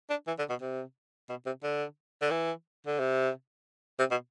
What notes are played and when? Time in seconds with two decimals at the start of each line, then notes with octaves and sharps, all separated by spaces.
0.10 D4
0.28 E3
0.38 D3
0.50 B2
0.62 C3
1.29 B2
1.46 C3
1.63 D3
2.22 D3
2.31 E3
2.87 D3
2.99 C3
3.99 C3
4.11 B2